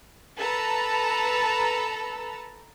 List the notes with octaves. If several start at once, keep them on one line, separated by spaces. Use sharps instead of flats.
A4 B4 A5 A#5